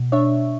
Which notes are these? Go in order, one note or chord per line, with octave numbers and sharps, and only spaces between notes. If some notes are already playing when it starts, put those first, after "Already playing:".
Already playing: B2
D4 C#5 E5